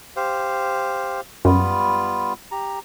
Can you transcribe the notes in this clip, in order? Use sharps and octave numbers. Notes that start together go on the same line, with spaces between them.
G4 C5 F5
F#2 G3 B3 F4
G4 A#5